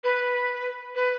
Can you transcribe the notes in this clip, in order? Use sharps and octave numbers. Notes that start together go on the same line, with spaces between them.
B4
B4